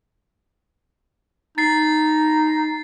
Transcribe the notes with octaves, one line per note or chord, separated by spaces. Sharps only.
D#4 A6 C7